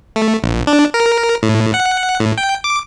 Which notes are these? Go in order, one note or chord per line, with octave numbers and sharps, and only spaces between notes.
A3
A#1
D4
A#4
A2
F#5
A2
G5
D6